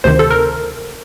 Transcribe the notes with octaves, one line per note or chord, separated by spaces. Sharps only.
D2 C3 D#3 C5
A4
A#4